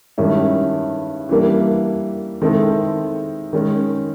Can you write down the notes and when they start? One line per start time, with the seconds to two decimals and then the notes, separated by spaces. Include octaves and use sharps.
0.18 G2 D#3 G#3 C#4 E4
1.29 E3 G3 A#3 D4
2.42 D#3 G#3 C4 E4 A4
3.53 D#3 G#3 C#4